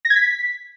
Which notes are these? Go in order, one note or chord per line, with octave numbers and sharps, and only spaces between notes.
A#6
G#6
B6